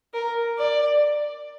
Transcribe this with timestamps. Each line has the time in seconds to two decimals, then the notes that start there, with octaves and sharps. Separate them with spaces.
0.14 A#4
0.58 D5